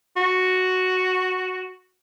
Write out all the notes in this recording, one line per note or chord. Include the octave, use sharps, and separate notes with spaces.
F#4